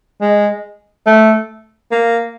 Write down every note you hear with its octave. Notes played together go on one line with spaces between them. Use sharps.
G#3
A3
A#3